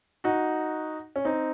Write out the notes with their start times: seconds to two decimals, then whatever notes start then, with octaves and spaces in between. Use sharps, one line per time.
0.24 D#4 F#4
1.16 C#4
1.25 C4 D#4